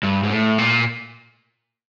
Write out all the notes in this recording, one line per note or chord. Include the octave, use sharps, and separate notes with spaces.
G2
G#2
A2
A#2